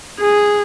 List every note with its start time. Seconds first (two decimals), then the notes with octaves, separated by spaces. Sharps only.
0.20 G#4